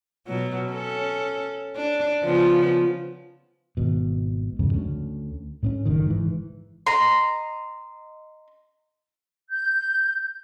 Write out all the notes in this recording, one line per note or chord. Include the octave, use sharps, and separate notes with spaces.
B2 F#3
C#4 A4
D4
C#3 F3 B3
G#1 B2
F2 G#2 C#3
D2 C#4
A2 B3 C#4
F#1 A2 D#3
G#2 E3
D#5 A#5 C6
G6